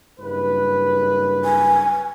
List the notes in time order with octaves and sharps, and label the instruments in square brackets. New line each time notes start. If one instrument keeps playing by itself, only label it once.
[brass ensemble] F#1 G2 B4
[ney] G#5